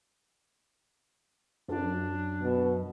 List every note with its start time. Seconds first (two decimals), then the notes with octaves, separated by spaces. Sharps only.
1.68 F#2 D4
2.42 B2